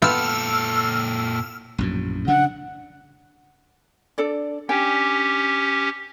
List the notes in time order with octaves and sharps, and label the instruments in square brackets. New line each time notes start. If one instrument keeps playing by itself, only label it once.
[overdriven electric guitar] A#2 A4 [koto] B3 F4 G5 [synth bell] E6 F6
[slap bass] A#1 F#2 A2
[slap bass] C#3 D4 [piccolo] F#5
[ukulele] D4 A4 D5
[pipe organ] C#4 G4 [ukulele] D4 G5 G#5